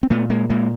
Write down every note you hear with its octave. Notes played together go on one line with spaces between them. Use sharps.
C4
A#2 A3 B3
G#3 A#3
A#2 G#3 A#3